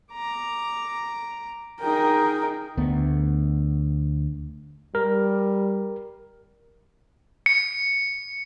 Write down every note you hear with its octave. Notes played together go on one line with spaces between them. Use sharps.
A#5 D6
D#4 G#4 A#4 G5
D2 A3 B3
G3 A#4
C#7